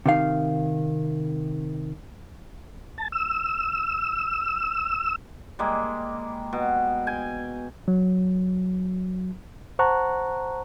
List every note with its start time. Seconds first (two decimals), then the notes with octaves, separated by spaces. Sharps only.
0.06 C3 D#3 F5
2.98 A5
3.12 E6
5.59 G3 G#3 A#3
6.53 B2
7.07 G5 G#5
7.88 F#3
9.79 C5 F#5 A5 A#5 C#6 F#6